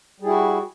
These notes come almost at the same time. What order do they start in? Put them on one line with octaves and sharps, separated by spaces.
G3 G#4 E4 F#4